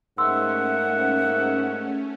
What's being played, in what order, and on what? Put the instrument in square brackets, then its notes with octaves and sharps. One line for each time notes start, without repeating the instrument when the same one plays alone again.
[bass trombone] G#2 [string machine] A3 C#4 [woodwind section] A#3 E5 F#5 [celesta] C6 E6